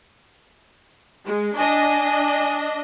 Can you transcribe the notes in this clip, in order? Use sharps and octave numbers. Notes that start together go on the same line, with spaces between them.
G#3
D4 D#5 G#5